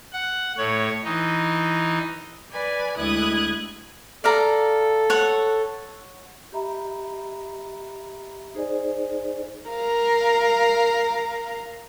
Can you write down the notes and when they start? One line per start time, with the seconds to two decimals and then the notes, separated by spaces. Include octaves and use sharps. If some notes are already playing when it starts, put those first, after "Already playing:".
0.12 F#5
0.57 A2 C#5
1.04 E3 D#4
2.51 B4 D5 G#5
2.95 D2 G#3 E4 D#6 F#6 G#6
4.24 A4 D5 F5 A#5
5.10 C#5 F#5
6.52 G4 D#5 E5 A#5 B5
8.55 D#4 G#4 C5 D5 D#5 G#5
9.70 A#4 F5